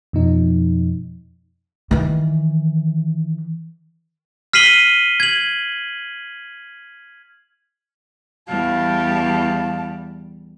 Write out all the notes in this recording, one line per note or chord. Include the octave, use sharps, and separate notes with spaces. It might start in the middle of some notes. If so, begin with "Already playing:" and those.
F2 B2 F3 D#4
D#3 E3
F6 B6 C7 D#7 F#7 G7
G#6 F#7
E2 G3 F5 A5